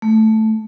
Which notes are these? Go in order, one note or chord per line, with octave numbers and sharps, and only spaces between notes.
A3